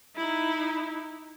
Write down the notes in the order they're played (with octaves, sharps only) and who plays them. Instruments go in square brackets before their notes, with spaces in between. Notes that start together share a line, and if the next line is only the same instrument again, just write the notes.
[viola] D#4 E4